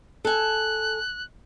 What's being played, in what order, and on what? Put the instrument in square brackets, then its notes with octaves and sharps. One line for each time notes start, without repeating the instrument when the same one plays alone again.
[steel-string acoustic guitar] A4 G#5 [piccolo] F#6